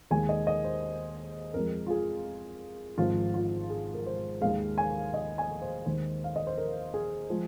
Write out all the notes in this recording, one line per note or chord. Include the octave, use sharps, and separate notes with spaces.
D#2 D#3 G#3 G#5
D#5
D#5
C5
F2 F3 G#3 A#4
F4
G#4
G#1 G#2 F3 F4
F4
G#4
A#4
C5
D#2 D#3 G#3 F5
G#5
D#5
G#5
C5
D#2 D#3 G#3 C5
F5
D#5
C5
A#4
G#4
F3 G#3